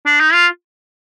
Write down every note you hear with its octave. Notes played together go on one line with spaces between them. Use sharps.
D4
D#4
F4